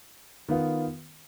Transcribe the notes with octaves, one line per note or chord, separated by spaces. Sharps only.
D#3 B3 F4